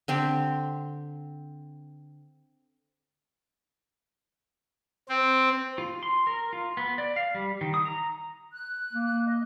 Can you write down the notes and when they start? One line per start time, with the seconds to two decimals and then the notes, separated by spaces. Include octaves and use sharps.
0.08 D3 C4 G4
5.09 C4
5.78 F4
6.03 C6
6.27 A#4
6.53 F4
6.77 B3
6.98 D5
7.16 F5
7.34 G3
7.61 D#3
7.74 D#6
7.85 A#5
8.52 F#6
8.93 A#3
9.26 D#5